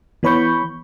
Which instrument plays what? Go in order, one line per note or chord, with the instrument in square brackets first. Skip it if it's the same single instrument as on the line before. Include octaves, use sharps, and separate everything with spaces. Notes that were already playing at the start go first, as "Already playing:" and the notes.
[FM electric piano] E3 B3 C#5 B5 C#6 G6